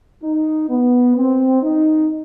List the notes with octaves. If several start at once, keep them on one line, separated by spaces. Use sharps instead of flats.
D#4
B3
C4
D#4